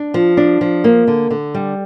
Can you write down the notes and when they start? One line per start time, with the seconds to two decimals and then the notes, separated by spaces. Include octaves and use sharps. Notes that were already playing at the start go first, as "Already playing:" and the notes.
Already playing: D4
0.14 F3
0.37 D4
0.61 F3
0.84 A#3
1.08 D3
1.31 D3
1.55 G3